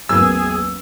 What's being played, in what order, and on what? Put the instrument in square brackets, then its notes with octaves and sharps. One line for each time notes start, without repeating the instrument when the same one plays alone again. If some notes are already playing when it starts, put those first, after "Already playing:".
[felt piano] A1 E2 [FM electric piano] F#3 A#3 B3 [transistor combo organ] G#4 [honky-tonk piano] E6